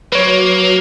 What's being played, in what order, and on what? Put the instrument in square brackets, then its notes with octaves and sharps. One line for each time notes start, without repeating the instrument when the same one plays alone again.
[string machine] F#3 [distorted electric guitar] A#3 [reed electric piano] B4 C#5